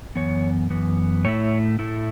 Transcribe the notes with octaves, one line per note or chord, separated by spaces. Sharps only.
F#2 E3 B3 C#5
F#2 E3 B3
A2 A3 E4 C#5
A2 A3 E4